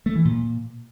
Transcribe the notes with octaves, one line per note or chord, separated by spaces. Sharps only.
A3
E3
A#2